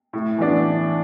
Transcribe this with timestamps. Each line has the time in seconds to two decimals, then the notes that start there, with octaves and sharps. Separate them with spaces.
0.13 A2
0.38 E3 B3 D4